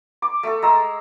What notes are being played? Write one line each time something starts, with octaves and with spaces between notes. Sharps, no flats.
D6
A3 A4
G#3 A#5 E6